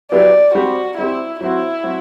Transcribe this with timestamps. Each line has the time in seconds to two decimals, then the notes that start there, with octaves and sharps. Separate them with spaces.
0.11 F#3 B3 E4 G4 D5
0.55 G3 C4 F#4 G4
0.98 G3 C4 E4 G4
1.41 F#3 C4 E4 F#4
1.83 F#3 C4 F#4